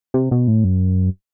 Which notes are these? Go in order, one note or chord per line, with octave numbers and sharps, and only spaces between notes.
C3
B2
A2
F#2